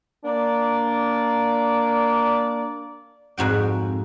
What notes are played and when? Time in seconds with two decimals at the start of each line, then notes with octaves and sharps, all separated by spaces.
0.24 A#3 D4 D5
3.38 F2 G#2 F#4 G5